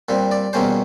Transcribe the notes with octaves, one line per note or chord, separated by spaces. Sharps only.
A#2 G3 C4
D5
E2 B2 G3 A#3 C#4 C5